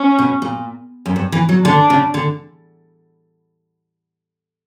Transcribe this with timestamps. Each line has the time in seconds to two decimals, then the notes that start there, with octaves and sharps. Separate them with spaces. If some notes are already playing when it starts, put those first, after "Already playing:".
Already playing: C#4
0.19 B2
0.42 A#2
1.06 F#2
1.16 G2
1.32 E3
1.49 F#3
1.65 D3 D4
1.90 C#3
2.14 D3